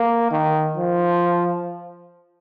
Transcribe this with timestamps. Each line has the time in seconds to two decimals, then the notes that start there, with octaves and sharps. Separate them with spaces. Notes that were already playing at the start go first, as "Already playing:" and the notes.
Already playing: A#3
0.31 D#3
0.77 F3